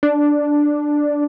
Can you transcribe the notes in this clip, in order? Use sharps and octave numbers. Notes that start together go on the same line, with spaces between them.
D4